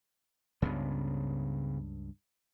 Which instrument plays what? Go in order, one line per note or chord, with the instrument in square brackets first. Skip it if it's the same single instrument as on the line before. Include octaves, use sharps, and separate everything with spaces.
[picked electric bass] C#2 G2 [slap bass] C#3 B3